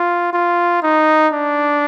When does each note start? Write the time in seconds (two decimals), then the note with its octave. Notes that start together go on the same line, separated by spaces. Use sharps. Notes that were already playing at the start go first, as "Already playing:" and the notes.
Already playing: F4
0.33 F4
0.83 D#4
1.33 D4